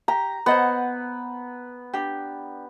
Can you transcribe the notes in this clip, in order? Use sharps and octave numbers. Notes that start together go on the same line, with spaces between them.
G4 A#5
B3 C5 D#5 F#5
D4 G4